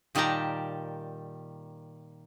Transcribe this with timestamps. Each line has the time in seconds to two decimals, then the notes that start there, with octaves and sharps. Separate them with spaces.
0.15 A#2 D#3 G3 G4 A5 A#5